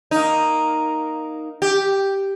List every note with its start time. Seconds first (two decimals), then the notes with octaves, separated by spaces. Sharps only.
0.11 A#3 D#4
1.62 G4